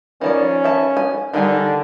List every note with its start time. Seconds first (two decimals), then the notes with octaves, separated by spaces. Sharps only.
0.21 D#3 F3 C#4 D5
0.64 E5 A5
0.97 G#5
1.34 D3 D#3 G3 G#5